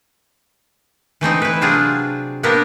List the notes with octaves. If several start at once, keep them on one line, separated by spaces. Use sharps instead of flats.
E3 A3 C4 D#4
E4 B4
C3 F#3 C4 D4 F4 G#4
A#3 B3 D4 G4 A#4